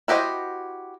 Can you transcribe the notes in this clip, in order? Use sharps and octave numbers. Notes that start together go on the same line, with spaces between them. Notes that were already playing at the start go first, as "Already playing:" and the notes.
E4 F#4 G4 C5 D#5